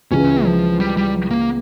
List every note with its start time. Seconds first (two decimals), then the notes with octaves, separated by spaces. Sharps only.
0.11 C#2 C#3 E3 G#3 C#4 E4
0.45 F3
0.80 G3
0.97 G3
1.31 A#3